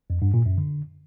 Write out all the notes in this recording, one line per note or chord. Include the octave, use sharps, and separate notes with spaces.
F2
G2
A#2
F#2
D3